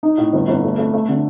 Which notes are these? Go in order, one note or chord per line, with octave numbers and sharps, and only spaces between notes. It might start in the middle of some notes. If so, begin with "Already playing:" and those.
D#4
A2
G1
G1
A3
A3
A3
D3